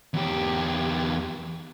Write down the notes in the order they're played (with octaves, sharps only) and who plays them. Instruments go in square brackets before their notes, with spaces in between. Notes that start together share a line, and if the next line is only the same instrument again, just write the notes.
[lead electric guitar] E2 G4